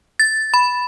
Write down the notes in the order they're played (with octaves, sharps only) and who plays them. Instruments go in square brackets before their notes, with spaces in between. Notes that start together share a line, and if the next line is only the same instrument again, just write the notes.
[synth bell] A6
B5